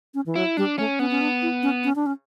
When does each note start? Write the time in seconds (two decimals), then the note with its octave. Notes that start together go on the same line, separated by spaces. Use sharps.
0.14 C#4
0.26 E3
0.36 F#3 E4
0.57 G3 D4
0.78 A3 C#4
0.99 B3 C#4
1.11 C#4
1.21 D4
1.42 E4
1.63 C#4
1.84 C#4
1.96 D4
2.06 C#4